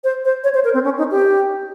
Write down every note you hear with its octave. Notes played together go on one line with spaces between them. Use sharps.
C5
C5
C#5
C5
A#4
C4
C#4
D#4
G4